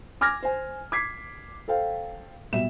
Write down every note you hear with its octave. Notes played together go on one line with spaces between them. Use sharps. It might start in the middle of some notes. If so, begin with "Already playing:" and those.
G#5 D6 F6 G#6 A#6
C5 G#5
D6 G#6 B6 C7
A4 C5 F5 G5
B2 G3 E5 E7